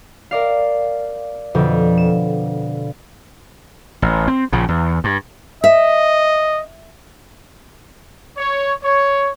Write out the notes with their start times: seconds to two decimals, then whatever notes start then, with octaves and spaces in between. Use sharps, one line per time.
0.31 A#4 D5 F5
1.55 F2 B2 D3 F3
1.98 E7
4.02 A1
4.28 C4
4.52 A#1 C#3 F3
4.69 E2
5.04 G2
5.64 D#5 E5
8.38 C#5
8.84 C#5